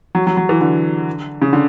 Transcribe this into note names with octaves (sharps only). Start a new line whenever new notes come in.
F#3
F#3
F#3
E3
D3
C#3
D3